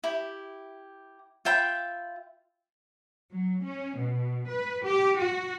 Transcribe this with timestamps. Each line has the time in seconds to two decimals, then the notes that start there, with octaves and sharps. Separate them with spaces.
0.04 E4 G4
1.45 F4 E5 G5 B5
3.32 F#3
3.64 C#4
3.97 B2
4.48 B4
4.86 G4
5.19 F#4